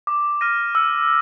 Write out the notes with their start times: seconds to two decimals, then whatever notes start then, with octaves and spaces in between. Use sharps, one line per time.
0.07 D6
0.41 F6 A#6 D#7
0.75 E6